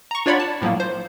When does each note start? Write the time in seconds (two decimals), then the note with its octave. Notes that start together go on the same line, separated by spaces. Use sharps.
0.11 A#5 C#6
0.26 D4 F4 C#5 D5 F#5 B5
0.40 A5
0.62 A2 F3 F#3 A#3
0.80 C5